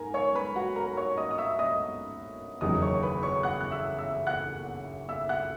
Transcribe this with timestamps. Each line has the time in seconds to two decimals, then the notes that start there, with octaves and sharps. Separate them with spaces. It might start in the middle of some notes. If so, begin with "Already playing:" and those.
Already playing: G#2 A#4 G#5 A#5
0.14 C#5 C#6
0.35 B4 B5
0.55 F#4 F#5
0.76 A#4 A#5
0.97 C#5 C#6
1.17 D#5 D#6
1.31 D#6
1.38 E5 E6
1.59 D#5 D#6
2.61 F#1 E2 D#3 F#3 D#5 D#6
2.82 C#5 C#6
3.03 B4 B5
3.23 C#5 C#6
3.43 F#5 F#6
3.61 F#6
3.71 E5 E6
3.98 E5 E6
4.26 F#5 F#6
5.09 E5 E6
5.29 F#5 F#6